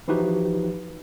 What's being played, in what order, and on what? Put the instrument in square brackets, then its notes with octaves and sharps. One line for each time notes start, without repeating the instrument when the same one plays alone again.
[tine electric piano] E3 F3 D#4 F#4 G4 B4